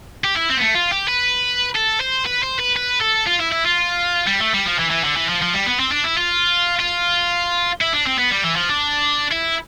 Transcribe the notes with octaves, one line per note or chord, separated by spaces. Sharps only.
G4
E4
C4
B3
A3
F4
G4
B4
A4
C5
B4
C5
B4
B4
A4
F4
E4
E4
F4
G3
A3
G3
F3
E3
E3
D3
E3
F3
F3
G3
B3
C4
D4
E4
F4
F4
E4
D4
C4
B3
G3
E3
F3
D4
E4